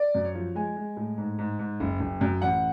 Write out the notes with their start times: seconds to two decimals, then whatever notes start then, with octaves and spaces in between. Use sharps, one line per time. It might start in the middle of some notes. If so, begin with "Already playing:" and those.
Already playing: D5
0.15 F#2
0.25 C#5
0.35 F3
0.55 G#3 G#5
0.76 G#3
0.97 A2
1.18 G#2
1.39 G#2
1.59 G#2
1.80 F#1
2.00 F#1
2.21 F#2
2.41 A1 F#5